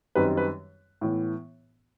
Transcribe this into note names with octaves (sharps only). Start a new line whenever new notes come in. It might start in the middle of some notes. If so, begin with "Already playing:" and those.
F#2 D#3 G3 C4 D#4 B4
B4
A2 E3 B3